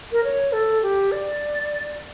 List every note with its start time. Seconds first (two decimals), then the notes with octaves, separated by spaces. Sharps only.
0.12 A#4
0.24 C#5
0.52 A4
0.82 G4
1.12 D5